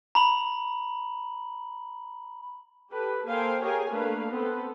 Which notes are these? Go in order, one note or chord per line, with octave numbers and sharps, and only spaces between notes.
A#5 B5 F#7
G4 A4 B4
A#3 A4 C5 F5 G5 G#5
G4 G#4 A#4 C#5 F5 G#5
A3 A#3 D4 B4 F5
B3 C4 A4 B4